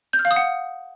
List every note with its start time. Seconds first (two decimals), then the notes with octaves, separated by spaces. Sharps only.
0.13 G6
0.19 F6
0.25 F5
0.31 D#6
0.36 F#5